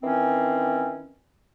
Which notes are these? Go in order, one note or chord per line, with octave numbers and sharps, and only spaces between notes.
D#3 E3 C4 C#4